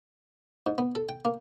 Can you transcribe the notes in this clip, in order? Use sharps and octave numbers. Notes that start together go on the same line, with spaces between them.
G#2
B3
A4
G5
A#3